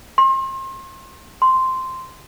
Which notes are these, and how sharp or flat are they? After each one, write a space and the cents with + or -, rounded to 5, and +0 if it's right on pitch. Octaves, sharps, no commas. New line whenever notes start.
C6 +35
C6 -5